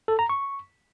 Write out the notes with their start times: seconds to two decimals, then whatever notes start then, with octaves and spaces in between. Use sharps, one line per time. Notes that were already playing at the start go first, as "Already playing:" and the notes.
0.08 A4
0.19 A#5
0.29 C#6